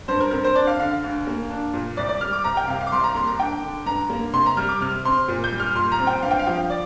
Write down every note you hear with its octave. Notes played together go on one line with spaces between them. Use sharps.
G2 C5
A#4
C4 A#4
C5
D4 D5
F5
D3 F5
F5
D2
A#3
D4
A#2
C2 D5
D5
G3 F6
D6
C2 A#5
G5
C3 F5
F5
D6
C2 C6
A#5
A#3 C6
A#5
D4 G5
D3
G2 A#5
A#3
C3 C6
A#5
G3 F6
D6
C3 F6
C4 C6
A#2
G6
G3
F6
A#2 C6
A#5
C4
G5
G2 F5
G5
F5
F3 G5
F5
D5